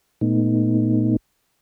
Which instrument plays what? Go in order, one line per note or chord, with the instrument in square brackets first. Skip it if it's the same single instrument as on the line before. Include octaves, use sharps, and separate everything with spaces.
[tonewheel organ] A#2 A3 B3 D#4